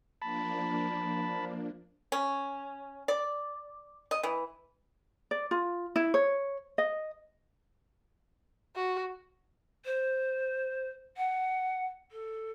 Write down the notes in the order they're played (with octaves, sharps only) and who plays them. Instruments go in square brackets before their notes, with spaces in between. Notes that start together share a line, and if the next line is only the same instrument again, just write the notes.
[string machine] F3 A#3 D4 [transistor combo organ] A5 B5
[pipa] C#4
D5
D#5
E3
[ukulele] D5
F4
E4
C#5
D#5
[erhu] F#4
[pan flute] C5
F#5
A4